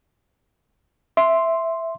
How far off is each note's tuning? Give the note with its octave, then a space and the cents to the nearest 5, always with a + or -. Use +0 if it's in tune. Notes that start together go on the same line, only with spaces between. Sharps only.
E5 +0 C6 +0